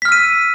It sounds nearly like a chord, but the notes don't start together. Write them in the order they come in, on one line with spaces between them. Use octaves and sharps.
B6 F6 E6 D#7